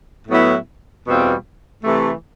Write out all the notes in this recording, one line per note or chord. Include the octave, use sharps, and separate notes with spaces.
A2 F#3 B3 E4
E2 B2 G3 C4 F4
C3 E3 A3